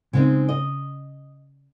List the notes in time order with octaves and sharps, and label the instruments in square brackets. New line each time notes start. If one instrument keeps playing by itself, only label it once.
[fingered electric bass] C#3 [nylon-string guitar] G#3 C4 D#4
[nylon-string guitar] D#5